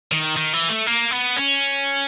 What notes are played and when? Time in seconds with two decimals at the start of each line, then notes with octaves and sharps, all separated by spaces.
0.12 D#3
0.37 D#3
0.53 E3
0.69 A3
0.87 A#3
1.12 B3
1.36 C#4